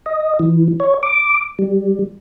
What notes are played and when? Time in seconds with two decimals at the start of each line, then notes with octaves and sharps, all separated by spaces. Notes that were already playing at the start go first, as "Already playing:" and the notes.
0.06 D#5
0.39 E3
0.80 C#5
1.03 D6
1.59 G3